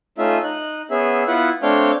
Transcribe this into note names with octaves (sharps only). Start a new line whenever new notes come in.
A3 C#4 D#4 F4 E5
D#4 F#6
B3 C#4 G#4 E5
B3 E4 F4 B4 F#5
A3 C4 D4 C#5 F5 G5